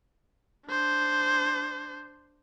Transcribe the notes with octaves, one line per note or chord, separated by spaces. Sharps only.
D4 C5